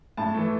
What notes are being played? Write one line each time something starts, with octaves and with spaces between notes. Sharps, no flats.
A2 A5
E3 A3